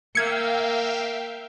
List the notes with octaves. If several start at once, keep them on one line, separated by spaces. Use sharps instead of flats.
A#3 E5 F5 G5 G#6 C#7